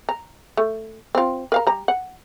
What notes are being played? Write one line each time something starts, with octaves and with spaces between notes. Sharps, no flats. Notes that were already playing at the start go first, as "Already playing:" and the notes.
A#5
A3
C4 F4
A#4 F5 A#5
G3 A#5
F#5